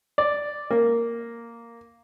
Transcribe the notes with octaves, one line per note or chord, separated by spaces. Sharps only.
D5
A#3